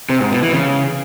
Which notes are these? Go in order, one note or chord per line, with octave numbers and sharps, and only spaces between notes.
C3
G#2
B2
E3
C#3